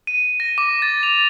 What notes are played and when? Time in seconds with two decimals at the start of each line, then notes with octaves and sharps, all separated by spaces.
0.07 D#7
0.40 A#6
0.58 D6
0.82 A6
1.03 F7